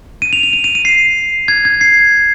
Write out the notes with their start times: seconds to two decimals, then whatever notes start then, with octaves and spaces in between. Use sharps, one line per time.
0.22 D#7
0.33 F7
0.43 F7
0.53 D#7
0.64 D#7
0.75 D#7
0.85 C7
1.48 G#6
1.65 G#6
1.81 C7